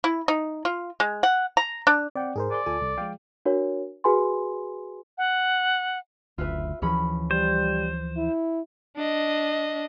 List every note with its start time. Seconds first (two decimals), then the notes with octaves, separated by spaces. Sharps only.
0.04 E4
0.28 D#4
0.65 F4
1.00 G#3
1.23 F#5
1.57 A#5
1.87 D4
2.15 C4 D5 F#5 G5
2.36 G#2 G#4 A#4 C5
2.51 D5 G#5 C6
2.66 D2 F4 A4 G#5
2.81 C2
2.98 F3 G#3 F5 G5
3.45 D4 F#4 A#4 C#5
4.04 F#4 G#4 B4 G#5 B5 C6
5.18 F#5
6.38 F#1 D2 F4 B4 E5
6.82 D2 E3 F3 C#4 G#4 B5
7.31 G3 C5
8.17 E4
8.97 D4 D#5